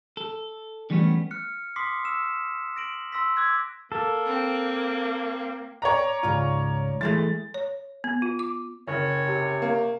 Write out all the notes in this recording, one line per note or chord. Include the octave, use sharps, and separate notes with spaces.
A4
D3 E3 G3 A3 B3 C#4
F6 F#6 C#7
C6 D6 D#6 B6 C7
E6 F6 E7
A#6 D7 F#7
C6 E6 A#6 B6
D6 E6 F#6 G#6 B6
A#3 A4
C4
C#5 D5 A#5
C#2 G#2 F4
E3 G#3 A3 A6
C#5
B3
F4
D6
F#1 C#5
C3
A#3